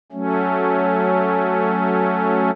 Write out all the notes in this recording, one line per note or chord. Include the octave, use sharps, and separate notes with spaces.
F#3 A3 C#4